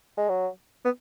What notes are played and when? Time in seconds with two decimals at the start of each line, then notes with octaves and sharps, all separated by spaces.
0.17 G#3
0.29 F#3
0.85 B3